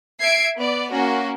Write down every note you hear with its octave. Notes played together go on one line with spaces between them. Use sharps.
E5 G#6 C7 D7
B3 D5
A#3 C#4 F#4